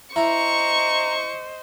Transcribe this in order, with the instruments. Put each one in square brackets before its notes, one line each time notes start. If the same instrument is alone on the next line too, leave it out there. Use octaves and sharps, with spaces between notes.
[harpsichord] E4 [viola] C5 D#5 [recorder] A#5 [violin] C#6